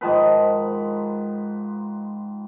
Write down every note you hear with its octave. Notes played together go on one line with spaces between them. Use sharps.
G#2 D#3 F3 B4